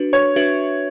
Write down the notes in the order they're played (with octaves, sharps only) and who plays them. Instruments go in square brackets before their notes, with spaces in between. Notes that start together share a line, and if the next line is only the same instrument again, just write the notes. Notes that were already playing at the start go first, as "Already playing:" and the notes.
Already playing: [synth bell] D4 F#4 B4
[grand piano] C#5
[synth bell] D4 F#4 B4 E5